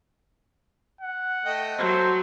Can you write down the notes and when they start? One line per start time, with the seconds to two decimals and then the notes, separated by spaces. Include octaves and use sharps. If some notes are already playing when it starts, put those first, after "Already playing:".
1.01 F#5
1.45 A3 D#5 G5
1.78 F#3 A4 C5